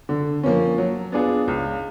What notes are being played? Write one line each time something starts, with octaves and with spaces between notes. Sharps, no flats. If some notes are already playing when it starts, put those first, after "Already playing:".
D3
F3 A#3 C#4
F#3
B3 D4 F4 G#4
C#2